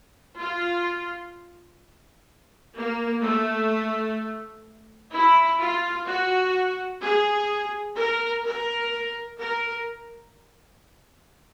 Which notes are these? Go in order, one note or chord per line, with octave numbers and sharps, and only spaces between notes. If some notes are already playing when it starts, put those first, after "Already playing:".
F4
A#3
A3
E4
F4
F#4
G#4
A#4
A#4
A#4